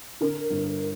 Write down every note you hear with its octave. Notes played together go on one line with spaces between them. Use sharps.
D3 A#4
G1